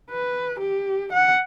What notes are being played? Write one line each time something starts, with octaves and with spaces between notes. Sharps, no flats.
B4
G4
F#5